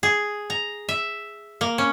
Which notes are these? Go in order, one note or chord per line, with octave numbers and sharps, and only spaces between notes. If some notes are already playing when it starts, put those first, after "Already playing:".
G#4
A#5
E5
A#3
C#4